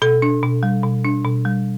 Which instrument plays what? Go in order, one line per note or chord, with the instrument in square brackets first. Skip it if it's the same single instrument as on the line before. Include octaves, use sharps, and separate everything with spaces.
[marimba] B2 A4
D4
B2
G3
B2
D4
B2
G3